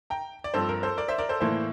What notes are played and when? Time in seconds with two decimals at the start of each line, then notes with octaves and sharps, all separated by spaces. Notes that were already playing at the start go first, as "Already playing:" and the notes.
0.10 G5 A#5
0.44 D5
0.54 G2 F3 C4 A4 C5
0.69 A#4
0.83 A4 C5
0.97 A#4 D5
1.08 C5 E5
1.18 A#4 D5
1.29 A4 C5
1.41 A2 E3 A#3 A4 C5